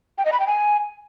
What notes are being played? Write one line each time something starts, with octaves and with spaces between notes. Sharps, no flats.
G5
D#5
B5
G5
G#5